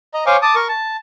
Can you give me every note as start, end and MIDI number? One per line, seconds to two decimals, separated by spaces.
0.14 0.24 75
0.14 0.24 82
0.26 0.37 72
0.26 0.37 73
0.26 0.37 77
0.26 0.37 80
0.26 0.37 85
0.26 0.37 86
0.42 0.55 81
0.42 0.55 86
0.42 0.55 87
0.55 0.68 70
0.55 0.68 85
0.69 0.97 81